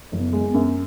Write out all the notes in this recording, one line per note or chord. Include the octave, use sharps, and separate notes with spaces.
F#1
B3
G#3
B3
F#2